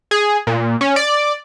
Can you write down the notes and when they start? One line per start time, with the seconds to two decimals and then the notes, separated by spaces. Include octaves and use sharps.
0.11 G#4
0.47 A#2
0.81 C#4
0.96 D5